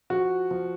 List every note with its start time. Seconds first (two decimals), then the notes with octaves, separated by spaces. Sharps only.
0.10 F3 F#4
0.51 F3